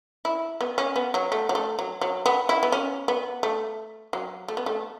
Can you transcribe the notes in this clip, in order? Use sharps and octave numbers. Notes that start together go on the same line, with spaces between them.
E4
B3
C#4
B3
F#3
A3
F#3
A3
F#3
F#3
B3
E4
B3
C#4
B3
A3
F#3
A3
B3
A3